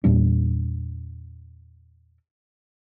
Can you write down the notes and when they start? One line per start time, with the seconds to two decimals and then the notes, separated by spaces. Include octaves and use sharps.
0.04 E2 A#2 G3 D4